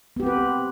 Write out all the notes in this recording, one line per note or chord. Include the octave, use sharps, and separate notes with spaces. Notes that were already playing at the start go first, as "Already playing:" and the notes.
B3 C4 G4 B4